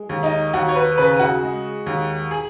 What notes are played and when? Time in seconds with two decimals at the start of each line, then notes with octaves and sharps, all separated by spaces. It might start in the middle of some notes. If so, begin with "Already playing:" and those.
Already playing: G#3
0.09 D#2
0.23 D#4
0.54 D#2 F#4
0.69 C#5
0.76 B4
0.98 C#3 B4
1.20 F#4
1.43 G#3
1.86 D#2
2.31 G#4